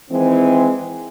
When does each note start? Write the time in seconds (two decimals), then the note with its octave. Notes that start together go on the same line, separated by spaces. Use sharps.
0.10 D#3 E3 G#3 C4